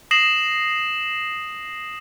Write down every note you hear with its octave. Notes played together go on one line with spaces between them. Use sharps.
D#6 A#6 C7 E7 F#7